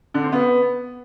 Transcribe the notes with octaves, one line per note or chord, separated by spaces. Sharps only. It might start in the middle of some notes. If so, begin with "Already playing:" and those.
D3
C4
B3